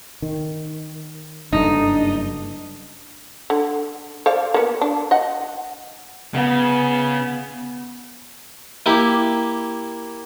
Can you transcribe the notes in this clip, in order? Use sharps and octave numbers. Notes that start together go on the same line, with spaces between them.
D#3
F#1 G2 D3 D4 D#4
D3
C5 D5 F5
A#3 B3
D4
D#5 F#5
C#3 B3
A#3 E4 G4